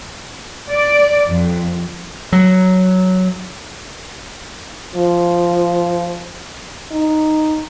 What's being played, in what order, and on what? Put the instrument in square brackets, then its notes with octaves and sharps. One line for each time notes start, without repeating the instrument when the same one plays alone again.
[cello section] D5
F2
[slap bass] F#3
[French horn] F3
D#4